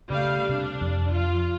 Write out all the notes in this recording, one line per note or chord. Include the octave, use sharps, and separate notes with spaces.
C#3 G3 A3 F5
C3 D4
F2
F4